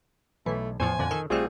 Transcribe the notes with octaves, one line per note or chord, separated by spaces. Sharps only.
B1 E3 A3
E2 A2 F3 C5 G#5
F2 A#2 D3
D#3 A4
A#1 G3 A3 C4 F4 G#4